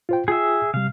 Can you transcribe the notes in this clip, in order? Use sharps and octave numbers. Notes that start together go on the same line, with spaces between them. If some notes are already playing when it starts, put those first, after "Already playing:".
F4 C5 G5
F4 G#4 E5 G5
C3 G3 F5